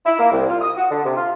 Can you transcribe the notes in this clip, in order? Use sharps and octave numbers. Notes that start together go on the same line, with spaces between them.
E4
A#3
C2
F4
D#6
F#4
D3
C3
F4